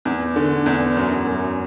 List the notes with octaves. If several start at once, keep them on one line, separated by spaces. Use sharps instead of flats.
E2
D3
E2
F#2
F#2